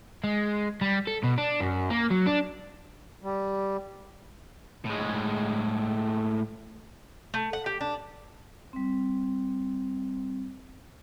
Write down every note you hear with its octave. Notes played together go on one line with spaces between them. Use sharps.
G#3
G3
A4
B2
D4
F#2
A#3
F#3
D4
G3
A2 G#3
A3
F#5
G4
D4
G3 C4